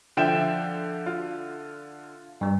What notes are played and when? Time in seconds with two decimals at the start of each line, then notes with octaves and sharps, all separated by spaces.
0.17 D3 F3 E5 G5 E7
1.06 F4
2.41 G2 G3